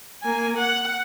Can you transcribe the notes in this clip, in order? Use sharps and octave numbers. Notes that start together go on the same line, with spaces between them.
A#3 G#5
F#5